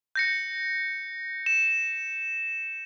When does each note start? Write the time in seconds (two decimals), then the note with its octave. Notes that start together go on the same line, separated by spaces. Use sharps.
0.15 G6 A#6 C#7
1.46 E7